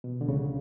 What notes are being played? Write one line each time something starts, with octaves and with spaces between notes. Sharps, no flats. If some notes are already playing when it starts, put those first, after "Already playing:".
B2
D3
C#2 C#3